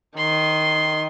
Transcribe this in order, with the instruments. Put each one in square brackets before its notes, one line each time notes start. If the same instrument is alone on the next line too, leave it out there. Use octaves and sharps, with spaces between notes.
[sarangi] D#3 [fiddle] C6